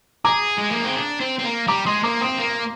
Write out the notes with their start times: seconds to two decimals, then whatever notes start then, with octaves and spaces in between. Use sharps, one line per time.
0.25 G#4 A#5 D6
0.58 G#3
0.71 A#3
0.84 C4
0.97 D4
1.20 C4
1.38 C4
1.44 A#3
1.67 G3 A#5 D6
1.86 G#3 C6 D#6
2.03 A#3 A#5 D6
2.21 C4 C6 D#6
2.39 A#3